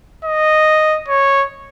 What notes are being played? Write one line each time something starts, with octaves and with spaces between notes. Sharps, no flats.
D#5
C#5